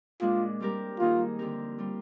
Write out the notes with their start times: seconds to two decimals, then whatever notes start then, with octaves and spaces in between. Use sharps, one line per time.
0.21 A#2 G#3 D4 F4
0.60 G3 C4 G4 A#4
1.00 D#3 A#3 D#4 F4 G#4
1.39 D3 F3 C4 G4 A#4
1.79 G3 C4 F4